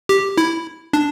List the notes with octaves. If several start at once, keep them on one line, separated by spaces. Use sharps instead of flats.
G4
E4
D4